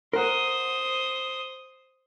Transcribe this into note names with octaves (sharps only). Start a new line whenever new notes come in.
A#4 C5 F#5 D#6